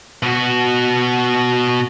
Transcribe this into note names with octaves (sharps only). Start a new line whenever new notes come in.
B2 F#4